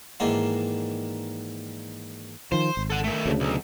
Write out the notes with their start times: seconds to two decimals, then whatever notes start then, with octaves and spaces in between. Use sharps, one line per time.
0.20 G#2 D#3 E3 A#3 D4 C6
2.52 D#3 F3 C5
2.77 G#1
2.90 A4 F#5
3.04 D#3 A3
3.26 D2 C#3
3.40 B1